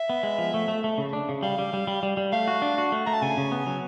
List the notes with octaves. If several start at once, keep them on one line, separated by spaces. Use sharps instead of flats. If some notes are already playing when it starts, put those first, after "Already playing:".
Already playing: E5
B3
G#3
F3
A3
A3
A3
C#3
D4
C#3
G3 F5
G3
G3
G3
G3
G3
A3 F5
F#4
D4
F#4
A3
A3 A#5
A5
C#3 G#5
C#3
B3
F#3